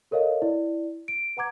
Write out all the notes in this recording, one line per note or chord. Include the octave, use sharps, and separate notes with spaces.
A4 A#4 C#5 D#5 F5
E4 D5
D7
B4 F#5 A#5 D6 G#6